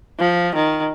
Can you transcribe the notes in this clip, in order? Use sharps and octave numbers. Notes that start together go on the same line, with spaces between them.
F3
D#3